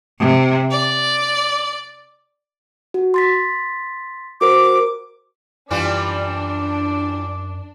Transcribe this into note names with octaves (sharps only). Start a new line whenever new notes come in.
C3
D5
F#4
C6 A6 B6
F#4 A#4 C5 D6
F#2 E3 G3 D4 F4 D6